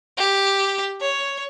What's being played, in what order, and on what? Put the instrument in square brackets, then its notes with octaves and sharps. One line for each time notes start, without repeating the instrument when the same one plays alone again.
[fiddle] G4
C#5